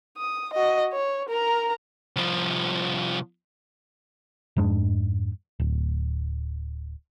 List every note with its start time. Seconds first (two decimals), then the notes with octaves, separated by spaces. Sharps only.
0.17 D#6
0.53 F#4 D#5
0.92 C#5
1.29 A#4 A#5
2.16 C2 F3
4.57 F2 G#2 G#3 D4
5.60 D1